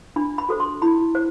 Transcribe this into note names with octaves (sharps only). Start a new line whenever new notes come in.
D4 B5
B5
F#4 A4 C5
C6
E4 B5
C5